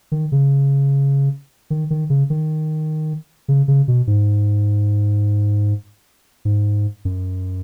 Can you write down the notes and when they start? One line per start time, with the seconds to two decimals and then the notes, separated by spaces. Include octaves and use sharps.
0.12 D#3
0.32 C#3
1.70 D#3
1.90 D#3
2.10 C#3
2.30 D#3
3.48 C#3
3.68 C#3
3.88 B2
4.07 G#2
6.45 G#2
7.05 F#2